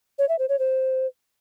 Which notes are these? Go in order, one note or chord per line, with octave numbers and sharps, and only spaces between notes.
C#5
E5
C5
C#5
C5